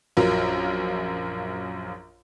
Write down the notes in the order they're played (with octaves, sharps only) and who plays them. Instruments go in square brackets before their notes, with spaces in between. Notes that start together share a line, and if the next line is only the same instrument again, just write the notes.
[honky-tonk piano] A#1 F#2 F#3 F4 A#4